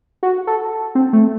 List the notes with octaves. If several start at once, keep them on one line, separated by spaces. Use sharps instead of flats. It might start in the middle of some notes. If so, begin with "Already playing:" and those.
F#4
A4
C4
A3